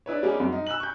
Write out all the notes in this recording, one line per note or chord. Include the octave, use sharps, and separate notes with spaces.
D4 E4 B4 C#5
G3 G#3 A#3 C#4 G#4
F#2
D#4
E6 F#6 F#7
C#6 G6